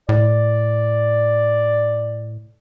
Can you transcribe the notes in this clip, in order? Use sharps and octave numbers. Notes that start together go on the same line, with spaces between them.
A2 D5